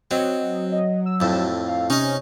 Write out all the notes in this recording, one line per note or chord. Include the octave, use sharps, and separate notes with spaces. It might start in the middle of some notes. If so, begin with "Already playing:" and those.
F#3 C4 D#5
D#5
E6
F2 A2
F5
C3 C#4 D#4 D#5